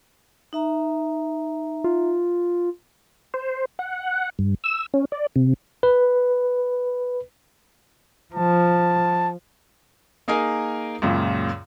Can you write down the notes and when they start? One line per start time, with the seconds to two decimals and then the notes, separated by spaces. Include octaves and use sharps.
0.53 D#4 E5 A#5
1.84 F4
3.34 C5
3.79 F#5
4.39 G2
4.64 E6
4.94 C#4
5.12 D5
5.36 C3
5.83 B4
8.34 F3 A5
10.28 A#3 D#4 G#4 A#4 G#5
11.02 C#2 F#2 A#2 C#3